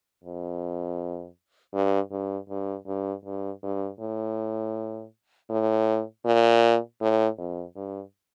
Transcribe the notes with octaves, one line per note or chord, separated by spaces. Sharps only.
F2
G2
G2
G2
G2
G2
G2
A2
A2
A#2
A2
F2
G2